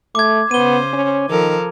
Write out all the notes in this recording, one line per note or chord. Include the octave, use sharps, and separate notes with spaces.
A3 D6 G#6
C#3 B3 C5 D#7 G7
C#4
D#3 F3 A4 A#4